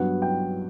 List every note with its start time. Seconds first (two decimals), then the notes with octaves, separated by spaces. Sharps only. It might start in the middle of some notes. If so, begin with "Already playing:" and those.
Already playing: G2 F#3 B3 F#5
0.22 G5